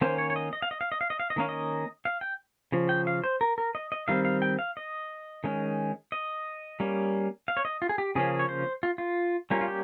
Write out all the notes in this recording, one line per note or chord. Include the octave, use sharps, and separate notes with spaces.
D#3 A#3 C#4 C5
C#5
C#5
D#5
D#5
F5
D#5
F5
D#5
F5
D#5
F5
D#5
D#3 A#3 C#4 F5
D#5
F5
G5
C#3 F3
G5
F5
C5
A#4
A#4
D#5
D#5
D#3 G3 C4 F5
F5
G5
F5
D#5
D#3 G#3 C#4
D#5
G3 A#3 C#4
F5
C#5
D#5
F4
G#4
G4
C#3 F3 A#3 C#4 G#4
C#5
C5
F4
F4
G3 A#3 C#4 F4
F4
G4